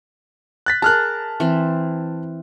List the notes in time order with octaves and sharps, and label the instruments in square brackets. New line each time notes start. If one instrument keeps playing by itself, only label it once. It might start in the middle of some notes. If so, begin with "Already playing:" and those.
[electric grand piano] F#6 A6 B6
[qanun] G#4 A#4 [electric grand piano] A5 F6 F#6
[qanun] E3 C4